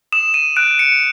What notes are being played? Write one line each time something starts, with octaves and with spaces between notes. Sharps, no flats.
D#6 E7
D#7
F#6 D7
C#7